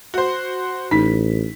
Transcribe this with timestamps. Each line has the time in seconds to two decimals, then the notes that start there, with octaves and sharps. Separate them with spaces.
0.14 F#4 C5
0.91 A1 D#4 B6